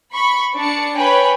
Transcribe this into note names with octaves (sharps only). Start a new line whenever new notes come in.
B5 C#6
D4 C#7
B4 C#5 G5 G#5 B5